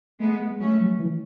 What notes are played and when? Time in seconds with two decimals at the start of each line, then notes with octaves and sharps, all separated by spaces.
0.20 G#3 A3 B3
0.40 G#3
0.60 F#3 A3 C#4
0.80 F#3
0.99 E3